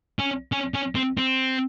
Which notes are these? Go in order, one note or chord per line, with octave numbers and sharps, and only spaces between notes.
C#4
C#4
C#4
C4
C4